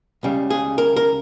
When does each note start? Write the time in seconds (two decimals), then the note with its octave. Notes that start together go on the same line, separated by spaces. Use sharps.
0.23 C#2 C#3 G3
0.50 G#4
0.78 A#4
0.96 A#4